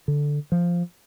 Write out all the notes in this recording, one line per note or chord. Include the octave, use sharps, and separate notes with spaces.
D3
F3